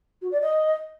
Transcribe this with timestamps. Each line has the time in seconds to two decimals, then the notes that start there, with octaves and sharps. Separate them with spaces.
0.21 F#4
0.31 D5
0.41 D#5